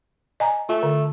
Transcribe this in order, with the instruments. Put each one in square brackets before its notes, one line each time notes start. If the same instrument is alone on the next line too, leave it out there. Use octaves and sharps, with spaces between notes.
[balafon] D#5 G#5 A#5
[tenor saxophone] A3 [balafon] F4
[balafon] D3